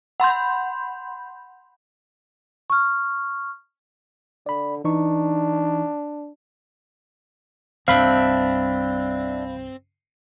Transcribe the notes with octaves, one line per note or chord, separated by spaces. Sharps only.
F#5 B5 C6 G6
C#6 F6
D3 D5 B5
E3 D4 D#4 C#6
C2 G2 C4 D4 E5 F5 B5